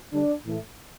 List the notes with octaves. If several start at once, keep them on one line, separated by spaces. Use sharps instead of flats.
D3 G3 D4
A2 E3 A3